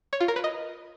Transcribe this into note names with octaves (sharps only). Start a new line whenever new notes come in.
C#5
F4
A#4
B4
D#5